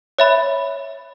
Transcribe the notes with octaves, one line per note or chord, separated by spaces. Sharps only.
C#5 E5 B5